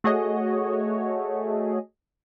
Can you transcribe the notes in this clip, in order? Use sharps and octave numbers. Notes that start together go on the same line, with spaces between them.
A3 F#4 G#4 C#5 D#5